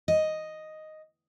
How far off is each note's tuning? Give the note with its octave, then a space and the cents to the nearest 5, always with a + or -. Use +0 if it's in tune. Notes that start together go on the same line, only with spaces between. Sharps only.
D#5 +0